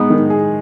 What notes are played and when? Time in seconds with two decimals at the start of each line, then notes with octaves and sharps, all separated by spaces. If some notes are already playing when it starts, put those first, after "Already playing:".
Already playing: G#3 B3 D#4
0.10 D#3
0.30 G#4